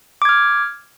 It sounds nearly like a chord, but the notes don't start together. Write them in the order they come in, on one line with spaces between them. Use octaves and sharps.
D6 G#6 F6